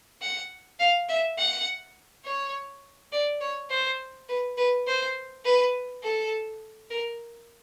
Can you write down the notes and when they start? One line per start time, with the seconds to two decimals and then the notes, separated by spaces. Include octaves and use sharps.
0.22 F#5
0.80 F5
1.09 E5
1.38 F#5
2.25 C#5
3.12 D5
3.41 C#5
3.70 C5
4.29 B4
4.58 B4
4.87 C5
5.45 B4
6.03 A4
6.90 A#4